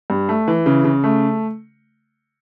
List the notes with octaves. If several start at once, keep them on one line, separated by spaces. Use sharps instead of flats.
G2
A3
E3
C#3
C#3
A3